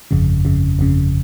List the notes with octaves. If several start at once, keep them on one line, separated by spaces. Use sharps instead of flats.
G1 F2 C#3
G1 F2 C#3
G1 F2 C#3